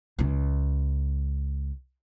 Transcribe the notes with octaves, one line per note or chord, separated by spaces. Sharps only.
C#2 C#4